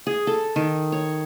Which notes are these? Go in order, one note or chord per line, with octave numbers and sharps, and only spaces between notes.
G#4
A4
D#3
C#5